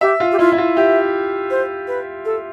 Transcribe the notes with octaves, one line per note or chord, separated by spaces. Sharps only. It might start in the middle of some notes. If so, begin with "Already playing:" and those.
G4 E5
F4
G4
E4 F4
E4
F4
G4 E5
C5
B4
A4